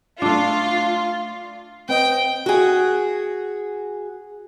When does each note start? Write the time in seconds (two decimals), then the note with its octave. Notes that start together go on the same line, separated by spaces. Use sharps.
0.22 A3 D4 F4
1.89 C4 B4 D#5 G5
2.46 F#4 G#4